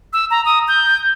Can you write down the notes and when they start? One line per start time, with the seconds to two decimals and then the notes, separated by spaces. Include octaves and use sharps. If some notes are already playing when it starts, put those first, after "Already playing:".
0.13 E6
0.31 A#5
0.45 D#6
0.68 G6